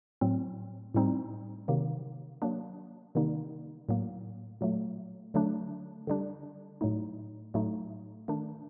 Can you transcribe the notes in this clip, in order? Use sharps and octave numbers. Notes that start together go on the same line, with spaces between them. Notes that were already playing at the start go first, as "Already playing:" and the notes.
A2 F#3 C4
A2 G3 C4 D#4
C3 D#3 F#3 A#3
F#3 A#3 D4
C3 D#3 G3 A#3 D#4
A2 F#3 A#3
A#2 F#3 A3
D3 F#3 A3 D4
D3 G3 D4
A2 F#3 A3 D#4
A2 F#3 A3 D#4
D#3 A3 D4